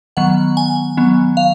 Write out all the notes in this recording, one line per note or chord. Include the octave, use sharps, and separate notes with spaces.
D#3 F#3 B3 F#5
G#5
D#3 F#3 B3
F5